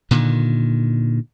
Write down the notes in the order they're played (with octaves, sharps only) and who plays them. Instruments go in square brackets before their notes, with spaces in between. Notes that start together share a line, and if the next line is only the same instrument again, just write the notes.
[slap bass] A#2 D3 D#3